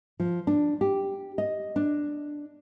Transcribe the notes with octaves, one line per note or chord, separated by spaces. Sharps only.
F3
D4
G4
D#5
D4